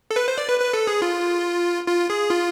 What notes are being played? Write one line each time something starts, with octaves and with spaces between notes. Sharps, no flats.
A4
B4
C5
D5
B4
B4
A4
G#4
F4
F4
G#4
F4